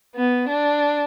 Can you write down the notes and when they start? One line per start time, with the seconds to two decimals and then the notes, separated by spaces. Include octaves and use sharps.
0.15 B3
0.48 D4